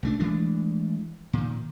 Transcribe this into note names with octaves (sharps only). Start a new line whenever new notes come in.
C2 A3 D4
E3 G#3 A3 D4
A#2 D#3